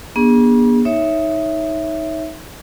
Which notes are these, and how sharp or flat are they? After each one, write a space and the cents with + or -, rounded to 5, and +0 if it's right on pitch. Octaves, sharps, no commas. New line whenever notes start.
B3 -45 D4 +0 G#4 -25
D#4 +10 C#5 +0 E5 +0